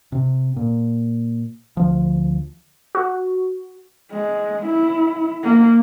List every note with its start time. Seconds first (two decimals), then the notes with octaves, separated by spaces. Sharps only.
0.12 C3
0.56 A#2
1.77 D2 F3
2.95 F#4
4.11 G#3
4.65 E4
5.43 A#3